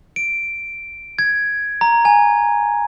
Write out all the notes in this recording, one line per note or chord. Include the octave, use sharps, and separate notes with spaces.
D7
G#6
A#5
G#5